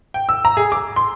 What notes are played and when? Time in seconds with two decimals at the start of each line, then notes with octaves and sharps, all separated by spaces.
0.14 G5
0.29 E6
0.45 A#5
0.57 G#4
0.72 D6
0.96 C6